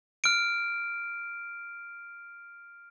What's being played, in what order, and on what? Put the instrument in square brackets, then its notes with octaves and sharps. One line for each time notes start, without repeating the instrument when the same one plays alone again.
[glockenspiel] F6 D7